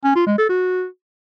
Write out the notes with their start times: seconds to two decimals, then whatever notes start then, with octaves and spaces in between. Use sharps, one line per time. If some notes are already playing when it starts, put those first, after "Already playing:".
0.04 C#4
0.15 F4
0.27 G#3
0.38 A4
0.49 F#4